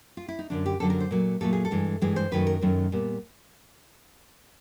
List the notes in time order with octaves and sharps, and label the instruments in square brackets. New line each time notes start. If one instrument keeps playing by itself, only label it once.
[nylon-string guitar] F4
E4
D#4
F#2 D3 F#3 D4
G4
F#2 D3 F#3 A4
A#4
C5
A#2 F#3 A3
A#2 F#3 A3 A4
G#4
A4
G2 E3 G#3
G2 E3 G#3 G#4
C5
F#2 D#3 F#3 A3 B4
A#4
F#2 D#3 F#3 A3
A#2 G3 B3